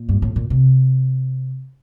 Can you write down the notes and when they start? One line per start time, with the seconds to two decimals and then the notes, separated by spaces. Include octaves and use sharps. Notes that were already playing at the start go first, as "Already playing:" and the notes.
Already playing: A#2
0.09 G2
0.22 A2
0.36 A#2
0.50 C3